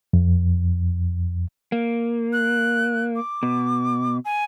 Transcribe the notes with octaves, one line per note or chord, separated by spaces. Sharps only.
F2
A#3
F#6
D6
B2
G#5